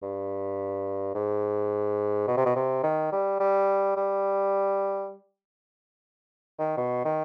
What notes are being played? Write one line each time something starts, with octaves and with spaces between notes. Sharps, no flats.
G2
G#2
B2
C3
B2
C3
D#3
G3
G3
G3
D#3
B2
D#3